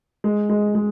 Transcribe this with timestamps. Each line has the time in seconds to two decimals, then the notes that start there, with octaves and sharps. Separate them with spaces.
0.24 G#3
0.49 G#3
0.75 G#3